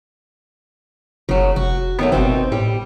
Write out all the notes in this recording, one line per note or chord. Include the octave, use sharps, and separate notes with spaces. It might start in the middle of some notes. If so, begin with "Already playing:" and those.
F#1 C#3 F#3
F1 F#4
D#3 F#3 A3 B3
G1 B2 D#3 C4
A2 G3